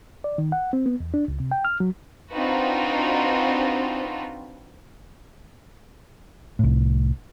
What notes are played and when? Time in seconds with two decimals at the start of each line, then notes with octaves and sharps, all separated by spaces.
0.24 D5
0.38 D#3
0.52 F#5
0.73 C4
0.86 B3
1.00 E2
1.14 D4
1.28 C#2
1.40 C3
1.51 G5
1.65 F6
1.80 F#3
2.32 C4 D4 D#4 F4 F#4 B4
6.59 C2 A2